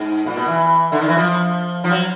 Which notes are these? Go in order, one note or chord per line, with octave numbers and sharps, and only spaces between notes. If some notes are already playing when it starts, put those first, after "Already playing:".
Already playing: G#2
A#2
B2
E3
D3
D#3
E3
F3
F3
F#3